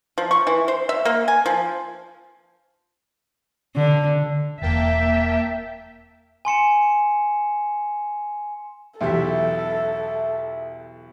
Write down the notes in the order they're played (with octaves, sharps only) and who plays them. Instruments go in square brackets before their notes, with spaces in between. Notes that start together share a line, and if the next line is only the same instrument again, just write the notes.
[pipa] F3
C#6
E3
C5
E5
A#3
G#5
F3
[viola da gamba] D3
[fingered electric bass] E1 [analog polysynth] A#3 G5 A5 [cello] E5
[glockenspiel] G#5 C6 C#7 E7
[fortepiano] B1 E2 G4 [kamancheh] A4 [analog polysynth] E5